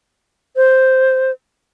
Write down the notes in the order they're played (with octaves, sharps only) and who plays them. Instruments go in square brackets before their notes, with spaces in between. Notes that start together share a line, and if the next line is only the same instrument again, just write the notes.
[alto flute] C5